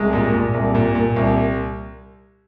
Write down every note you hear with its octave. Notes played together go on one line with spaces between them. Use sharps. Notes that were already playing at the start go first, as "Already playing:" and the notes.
Already playing: C2 G#3
A#2
A#2
C2
A#2
A#2
C2